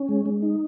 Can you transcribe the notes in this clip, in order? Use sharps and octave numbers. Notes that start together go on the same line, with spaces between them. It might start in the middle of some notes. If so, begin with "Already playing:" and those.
Already playing: C#4
G#3
G#3
D#4